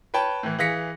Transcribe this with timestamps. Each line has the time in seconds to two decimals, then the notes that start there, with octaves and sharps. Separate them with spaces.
0.14 B4 C#5 G5 A5 B5
0.43 A2 E3
0.58 E3 G#4 F5 A#6 B6 C#7